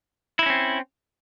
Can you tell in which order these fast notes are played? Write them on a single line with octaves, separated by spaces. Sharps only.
E4 D#4 C#4 C4